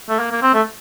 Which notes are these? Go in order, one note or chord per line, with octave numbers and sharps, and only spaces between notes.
A3
A#3
A#3
C4
A3